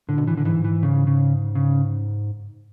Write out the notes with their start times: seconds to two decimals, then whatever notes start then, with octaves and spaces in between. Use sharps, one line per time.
0.09 A2 D3
0.18 B2
0.27 A2 E3
0.37 D3
0.45 G#2 E3
0.64 E3
0.83 C#3
1.07 C#3
1.55 C#3